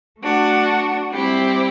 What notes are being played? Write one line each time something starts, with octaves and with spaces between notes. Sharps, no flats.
A3 D4 F#4
G3 C4 E4 G4